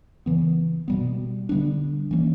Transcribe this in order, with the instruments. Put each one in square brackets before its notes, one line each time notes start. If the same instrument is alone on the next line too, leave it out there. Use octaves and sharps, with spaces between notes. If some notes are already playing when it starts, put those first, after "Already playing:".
[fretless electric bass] C#3 E3 B3
B2 G3 B3
D3 G3 B3 D4
E3 A#3 C#4